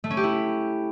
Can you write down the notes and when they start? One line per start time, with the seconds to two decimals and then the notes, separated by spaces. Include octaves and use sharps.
0.04 A3
0.10 C#4
0.17 G4
0.24 E4